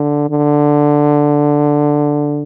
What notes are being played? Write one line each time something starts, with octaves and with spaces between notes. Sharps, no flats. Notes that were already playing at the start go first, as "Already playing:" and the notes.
Already playing: D3
D3